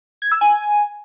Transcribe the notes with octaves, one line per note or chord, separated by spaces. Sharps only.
G#6
E6
G#5